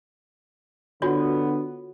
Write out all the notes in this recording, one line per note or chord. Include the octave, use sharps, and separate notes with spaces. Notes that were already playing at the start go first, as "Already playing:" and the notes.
D3 B3 F4 F#4 C#5